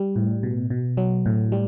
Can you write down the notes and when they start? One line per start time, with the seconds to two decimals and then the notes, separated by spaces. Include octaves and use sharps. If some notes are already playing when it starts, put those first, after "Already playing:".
Already playing: G3
0.16 A2
0.43 B2
0.70 B2
0.97 F#3
1.26 A2
1.52 G3